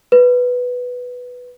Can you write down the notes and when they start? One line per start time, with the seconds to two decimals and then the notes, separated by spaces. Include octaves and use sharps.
0.12 B4